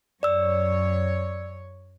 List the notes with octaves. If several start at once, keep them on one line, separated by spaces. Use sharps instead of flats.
F#2 C#5 D5 E6